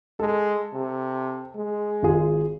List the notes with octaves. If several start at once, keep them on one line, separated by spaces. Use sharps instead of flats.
G#3 A4
C3
G#3
G#1 F4 G#4